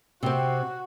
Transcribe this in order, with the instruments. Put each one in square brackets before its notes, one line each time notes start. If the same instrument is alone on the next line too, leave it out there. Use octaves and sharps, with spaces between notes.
[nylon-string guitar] C3 C4 [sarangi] F#4